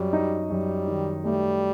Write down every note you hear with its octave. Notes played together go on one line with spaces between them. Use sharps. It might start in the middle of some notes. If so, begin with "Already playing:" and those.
Already playing: F#2 G3
D#4
F#2 G3
D#3
G3 A3